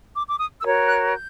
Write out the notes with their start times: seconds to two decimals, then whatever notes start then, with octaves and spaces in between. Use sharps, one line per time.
0.14 D6
0.30 D6
0.38 D#6
0.63 F#4 A#4 C#5 E6
0.87 F#6
1.10 G6